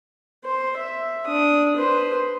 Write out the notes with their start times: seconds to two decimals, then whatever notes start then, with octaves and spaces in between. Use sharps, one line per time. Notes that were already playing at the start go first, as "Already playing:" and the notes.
0.44 C5
0.77 E5
1.26 D4 D#6
1.76 B4 C5